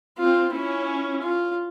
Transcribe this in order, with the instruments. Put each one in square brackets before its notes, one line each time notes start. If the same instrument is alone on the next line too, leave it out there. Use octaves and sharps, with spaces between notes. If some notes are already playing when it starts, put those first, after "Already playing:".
[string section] C4 [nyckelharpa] F4
[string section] C#4 [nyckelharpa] E4
[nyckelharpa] F4